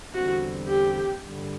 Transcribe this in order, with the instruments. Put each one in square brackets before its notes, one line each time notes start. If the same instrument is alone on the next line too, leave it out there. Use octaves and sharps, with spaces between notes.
[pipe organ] E2 D3 G3 C4 [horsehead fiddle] F#4
[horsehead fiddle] G4
[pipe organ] G2 D3 G3